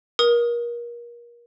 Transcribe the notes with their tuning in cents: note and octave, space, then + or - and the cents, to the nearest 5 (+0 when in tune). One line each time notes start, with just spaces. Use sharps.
A#4 +30 D#6 +0